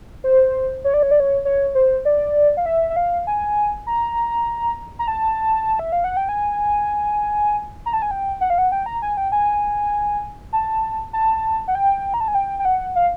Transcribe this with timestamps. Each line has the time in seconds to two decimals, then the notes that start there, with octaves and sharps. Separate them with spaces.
0.24 C5
0.84 C#5
0.94 D5
1.03 C#5
1.11 D5
1.20 C#5
1.45 C#5
1.75 C5
2.05 D5
2.57 F5
2.66 E5
2.90 E5
2.96 F5
3.27 G#5
3.87 A#5
4.99 A#5
5.08 A5
5.79 E5
5.92 F5
6.04 F#5
6.17 G5
6.29 G#5
7.86 A#5
7.93 A5
8.02 G#5
8.11 G5
8.41 F#5
8.50 F5
8.58 F#5
8.72 G5
8.86 A#5
9.02 G#5
9.17 G5
9.32 G#5
10.53 A5
11.13 A5
11.68 F#5
11.75 G5
12.14 A#5
12.20 A5
12.28 G#5
12.35 G5
12.59 G5
12.65 F#5
12.96 F5